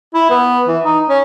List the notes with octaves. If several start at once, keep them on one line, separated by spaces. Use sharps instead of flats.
E4
B3
E3
D#4
C#4